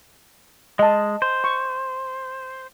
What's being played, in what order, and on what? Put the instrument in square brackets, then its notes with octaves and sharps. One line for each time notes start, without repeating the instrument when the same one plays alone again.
[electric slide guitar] G#3 [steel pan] D#5 A5
[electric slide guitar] C5
[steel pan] C#6